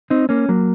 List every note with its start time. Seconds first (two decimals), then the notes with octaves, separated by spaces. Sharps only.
0.10 C4 D#4
0.29 A#3 C#4
0.49 F#3 A#3